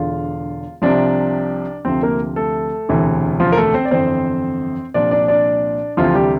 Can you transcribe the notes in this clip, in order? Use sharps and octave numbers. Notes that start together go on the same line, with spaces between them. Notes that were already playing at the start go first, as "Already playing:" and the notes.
Already playing: E1 E2 D3 F4 F5
C2 C3 F3 D4 D5
D2 C3 F3 C4 C5
A#3 A#4
A3 A4
E1 D2 C3 E3
F3 F4
A#4
A3 A4
C4 C5
D5
G1 F2 E3 C4 C5
C2 A#2 F3 D4 D5
D4 D5
D4 D5
D2 C3 E3 F3 F4
G3 G4